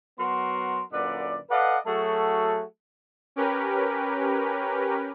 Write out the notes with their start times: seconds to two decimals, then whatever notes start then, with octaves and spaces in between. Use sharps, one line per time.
0.20 F#3 B3 F#4 A#4 C6
0.93 F#2 A#2 D3 B4 D5
1.50 A4 B4 D5 D#5 F5 F#5
1.86 F#3 A3 F#4 G#4 A4
3.36 C#4 G4 A#4 B4